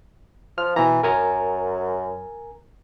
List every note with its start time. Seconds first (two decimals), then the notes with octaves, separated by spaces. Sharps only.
0.58 F3 F6
0.76 B2 E3 A#5
1.03 F#2 A#4 G#5 A#5